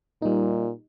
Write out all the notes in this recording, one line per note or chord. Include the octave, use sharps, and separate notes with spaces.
A#2 G3 D#4